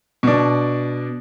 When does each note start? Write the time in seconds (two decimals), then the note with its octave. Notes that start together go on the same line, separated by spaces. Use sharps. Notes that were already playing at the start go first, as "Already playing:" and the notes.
0.23 B2 D4